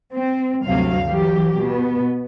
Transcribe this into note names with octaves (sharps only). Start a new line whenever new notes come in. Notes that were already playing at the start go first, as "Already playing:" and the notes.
C4
D2 G2 C3 F#3 F5
E3 F#3 G4
B2 B3